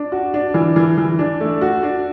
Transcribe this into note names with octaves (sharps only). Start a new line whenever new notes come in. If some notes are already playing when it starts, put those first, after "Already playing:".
Already playing: D4
F#4
D4
E3
E3
E3
D4
A3
F#4
D4